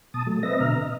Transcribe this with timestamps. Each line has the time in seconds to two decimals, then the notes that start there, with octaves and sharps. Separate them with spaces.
0.14 B2 A5 D#6
0.27 F#3 A3
0.43 C4 B4 D#5 E5 A#6
0.61 B2 D3 E5 A#5 F6
0.81 D#5